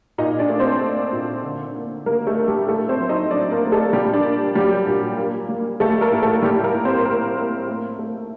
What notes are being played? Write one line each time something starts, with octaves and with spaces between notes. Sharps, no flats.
A#2 D#4 D#5
D4 D5
A3
C4 C5
A3
A#2
D3
A#3
G3 A#3 A#4
A3 A4
A#3
G3 G4
A2 A3 A4
C4 C5
F#3
D#4 D#5
F#3 D4 D5
A#3 A#4
A3
A3 A4
A#2 G3 G4
D4 D5
A#3
F#3 G3 G4
A#2
A#3
G3
G3 A3 A4
A#3 A#4
A2
A3 A4
A2 G3 G4
A#3 A#4
A2
C4 C5
A2 A#3 A#4
A#3
A3
A3